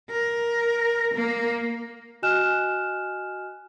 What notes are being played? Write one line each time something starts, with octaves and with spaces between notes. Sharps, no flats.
A#4
A#3
F#4 D#5 G#5 F6 F#6 E7